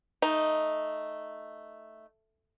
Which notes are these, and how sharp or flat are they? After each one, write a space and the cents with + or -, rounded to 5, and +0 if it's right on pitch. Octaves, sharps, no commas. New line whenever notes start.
A3 +0 D#4 +0